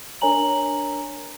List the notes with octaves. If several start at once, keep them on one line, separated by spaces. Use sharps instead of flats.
D4 A#4 C#5 G#5 A#5 F#7